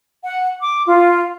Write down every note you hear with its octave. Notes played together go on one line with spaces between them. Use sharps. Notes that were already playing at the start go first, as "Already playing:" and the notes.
F#5
D6
F4